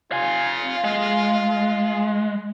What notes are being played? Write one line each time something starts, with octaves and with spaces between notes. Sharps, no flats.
F4 F5 G#5
G#3